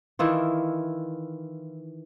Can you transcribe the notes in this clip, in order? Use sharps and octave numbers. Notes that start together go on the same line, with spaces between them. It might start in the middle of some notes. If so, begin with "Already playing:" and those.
D#3 E3 E4 F4